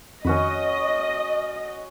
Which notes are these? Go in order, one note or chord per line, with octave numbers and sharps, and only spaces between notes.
F2 D#3 C#4 F#4 D#5 B5